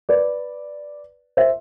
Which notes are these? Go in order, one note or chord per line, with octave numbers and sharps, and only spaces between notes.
B4 D5
C5 E5